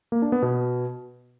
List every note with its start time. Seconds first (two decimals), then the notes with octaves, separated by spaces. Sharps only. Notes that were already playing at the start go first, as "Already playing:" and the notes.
0.12 A#3
0.22 D4
0.32 B3
0.42 B2